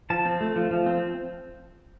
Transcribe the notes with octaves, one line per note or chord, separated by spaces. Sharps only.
F3 A5
C4
A3
F3
F3
C4